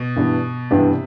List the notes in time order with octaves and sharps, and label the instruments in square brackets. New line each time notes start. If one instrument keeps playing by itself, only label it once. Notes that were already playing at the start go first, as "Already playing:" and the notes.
Already playing: [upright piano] B2
[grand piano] G2 E3 B3 D4 G4
[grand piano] G2 E3 B3 D4 G4 [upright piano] C3